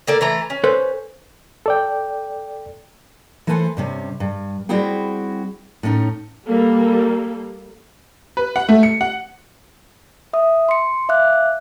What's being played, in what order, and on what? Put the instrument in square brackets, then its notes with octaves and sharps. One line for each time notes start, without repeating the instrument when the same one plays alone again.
[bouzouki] D3 A#3 D5
E3 A3 A#5
C#4
[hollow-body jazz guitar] A4 B4 C5
[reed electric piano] A4 D5 G5
[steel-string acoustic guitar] E3 A3 A4 B4 C5 G#5
G2 C3 C#4
G2
G3 C4 E4 F#4 G#4 G5
A2 A3 C#4 D#4
[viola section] G3 A#3 A4
[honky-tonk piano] B4
F#5
A3
C#7
F#5
[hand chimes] E5 D#6
C6 C#7
E5 F5 D6 F#6